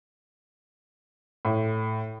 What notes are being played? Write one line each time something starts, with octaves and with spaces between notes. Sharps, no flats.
A2